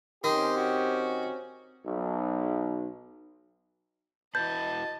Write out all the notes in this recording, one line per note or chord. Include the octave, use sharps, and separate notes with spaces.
D#3 C4 C#4 G4 C6
F#4
B1
E4 F#4 B4 D#5 A5 G6